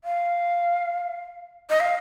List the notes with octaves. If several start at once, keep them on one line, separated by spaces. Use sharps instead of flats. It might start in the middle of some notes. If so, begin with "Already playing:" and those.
F5
D#5
F5